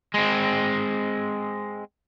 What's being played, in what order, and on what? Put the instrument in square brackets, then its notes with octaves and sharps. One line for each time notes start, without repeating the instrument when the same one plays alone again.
[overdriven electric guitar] G#3 C4